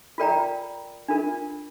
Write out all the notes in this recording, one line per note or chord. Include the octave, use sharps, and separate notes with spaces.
F4 A#4 D5 G5 A#5
D4 F4 A#4